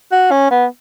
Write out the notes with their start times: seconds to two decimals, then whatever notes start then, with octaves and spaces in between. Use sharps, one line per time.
0.12 F#4
0.31 C#4
0.50 B3